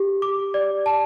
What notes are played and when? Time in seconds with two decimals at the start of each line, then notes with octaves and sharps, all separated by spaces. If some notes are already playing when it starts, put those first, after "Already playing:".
Already playing: G4
0.22 D6
0.54 D5
0.86 A5